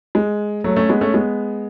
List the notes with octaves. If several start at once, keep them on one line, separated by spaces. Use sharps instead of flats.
G#3
F#3 A3
A3 C#4
G#3 B3
A3 C#4
G#3 B3